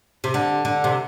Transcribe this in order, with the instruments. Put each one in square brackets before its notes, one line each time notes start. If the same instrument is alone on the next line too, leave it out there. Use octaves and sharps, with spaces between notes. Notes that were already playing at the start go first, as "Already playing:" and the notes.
[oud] C3
D3
D3
C3